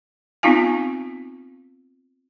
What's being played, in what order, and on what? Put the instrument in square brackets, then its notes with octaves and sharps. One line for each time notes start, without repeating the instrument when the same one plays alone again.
[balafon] B3 C4 D#4 F4 F5 G#5